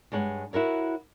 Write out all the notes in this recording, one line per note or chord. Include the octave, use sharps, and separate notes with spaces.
G2 G#3 C#5 F#5
E4 F#4 A#4 C#5